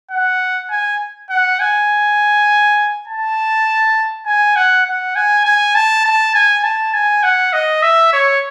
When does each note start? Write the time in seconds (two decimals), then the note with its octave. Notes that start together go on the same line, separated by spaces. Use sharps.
0.11 F#5
0.70 G#5
1.30 F#5
1.60 G#5
3.08 A5
4.26 G#5
4.56 F#5
4.86 F#5
5.16 G#5
5.45 G#5
5.75 A5
6.05 A5
6.35 G#5
6.64 A5
6.94 G#5
7.23 F#5
7.53 D#5
7.82 E5
8.13 C#5